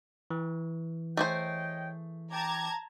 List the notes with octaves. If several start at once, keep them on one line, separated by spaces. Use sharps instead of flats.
E3
A3 G#4 C5 C#5 D#5 G5
G5 A5 A#5 D6 G#6